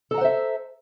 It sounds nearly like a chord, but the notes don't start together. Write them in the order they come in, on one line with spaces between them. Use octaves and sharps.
A4 A#5 F#5 C5 E5